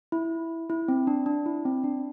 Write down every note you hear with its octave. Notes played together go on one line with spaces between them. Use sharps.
E4
E4
C4
D4
D4
E4
C4
D4